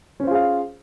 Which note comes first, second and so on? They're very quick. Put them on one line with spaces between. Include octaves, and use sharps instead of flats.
C#4 C5 F4 G#4 F5